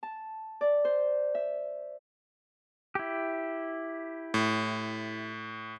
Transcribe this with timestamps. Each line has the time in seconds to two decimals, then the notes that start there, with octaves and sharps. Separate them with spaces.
0.03 A5
0.61 D5
0.85 C5
1.35 E5
2.95 E4 G4
4.34 A2